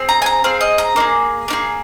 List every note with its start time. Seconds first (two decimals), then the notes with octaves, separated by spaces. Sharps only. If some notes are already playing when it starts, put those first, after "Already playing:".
Already playing: C4 G#4
0.09 A#5
0.22 G#5
0.26 A#5
0.44 C4 G#4 F5
0.61 D#5
0.78 A#5
0.96 A#3 D#4
1.00 G#4
1.48 A#3 D#4 G#4